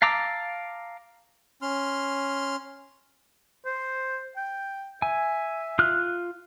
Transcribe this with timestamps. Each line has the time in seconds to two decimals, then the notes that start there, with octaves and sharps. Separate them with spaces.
0.02 F5 A5 A#5 D6 E6
1.62 C#4 C6 F6
3.66 C5
4.37 G5
5.02 E5 G#5
5.79 F4 F6 F#6